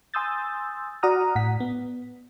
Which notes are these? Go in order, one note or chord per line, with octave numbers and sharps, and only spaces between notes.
G#5 C6 D#6 E6 G6 A6
F#4 D5 F#5 A#5 D#6 F6
A2 F#5 B6
B3